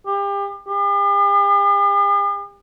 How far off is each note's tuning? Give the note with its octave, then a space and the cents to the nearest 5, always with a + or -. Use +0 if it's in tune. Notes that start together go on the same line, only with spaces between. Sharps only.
G4 +35
G4 +45